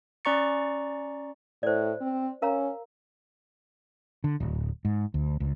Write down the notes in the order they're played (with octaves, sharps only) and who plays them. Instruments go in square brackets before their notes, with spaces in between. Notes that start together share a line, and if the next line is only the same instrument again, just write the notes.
[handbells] C#4 D5 A#5 C#6 A6 C#7
[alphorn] A2 [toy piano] C5 D5
[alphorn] C4
[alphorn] C#4 [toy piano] A#4 F5 A#5
[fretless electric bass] D3
D1
G#2
D2
C#2